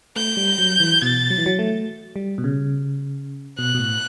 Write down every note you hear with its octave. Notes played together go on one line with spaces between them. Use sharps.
A3 G6
G3
F#3
E3
B2 A6
F#3
E3
F#3
A3
G3
B2
C#3
B2 F#6
B2
A2